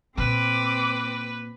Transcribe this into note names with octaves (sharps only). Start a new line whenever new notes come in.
A#2 C4 B4 D6